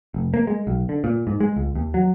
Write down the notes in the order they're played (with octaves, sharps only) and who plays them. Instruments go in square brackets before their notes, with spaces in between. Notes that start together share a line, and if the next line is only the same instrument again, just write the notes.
[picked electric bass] F1
A#3
G#3
B1
D3
A#2
G#2
G#3
C#2
D#2
F#3